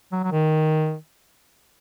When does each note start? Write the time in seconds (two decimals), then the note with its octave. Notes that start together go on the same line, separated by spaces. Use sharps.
0.12 F#3
0.23 F#3
0.32 D#3